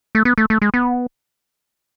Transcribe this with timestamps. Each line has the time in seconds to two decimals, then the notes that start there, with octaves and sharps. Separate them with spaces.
0.15 A3
0.25 B3
0.38 A3
0.50 A3
0.62 G#3
0.74 B3